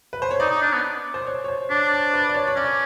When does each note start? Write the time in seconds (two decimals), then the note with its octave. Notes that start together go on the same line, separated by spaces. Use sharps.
0.13 B4
0.22 C5
0.31 C#5
0.40 D#4 D5
0.51 D#4
0.62 D4
0.73 B3
1.14 C5
1.27 C#5
1.44 C#5
1.48 C5
1.70 D4 C#5
1.92 C#5
2.14 B4
2.29 D5
2.34 C#5
2.47 C#5
2.56 C#4 D5